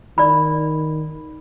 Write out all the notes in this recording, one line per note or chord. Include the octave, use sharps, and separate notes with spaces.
D#3 D5 B5